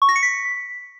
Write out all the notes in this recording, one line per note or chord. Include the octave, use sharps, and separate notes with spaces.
C#6
A#6
C#7
B6